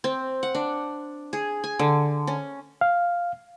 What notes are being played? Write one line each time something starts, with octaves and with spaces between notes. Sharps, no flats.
C4
F#5
D4
G#4
G#5
D3
C#4
F5